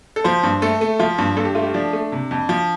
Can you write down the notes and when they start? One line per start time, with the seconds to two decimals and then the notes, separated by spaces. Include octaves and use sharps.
0.16 A4
0.24 F3 C5
0.43 G2
0.62 A3 A4
0.81 A3
0.99 F3 F4
1.18 G2
1.36 G2 A4
1.45 G4
1.55 A3 F4
1.63 G4
1.74 F3 D4
1.93 A3
2.12 C3
2.31 F2
2.49 F3